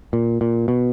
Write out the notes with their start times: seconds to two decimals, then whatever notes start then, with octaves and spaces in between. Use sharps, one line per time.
0.13 A#2
0.41 A#2
0.68 B2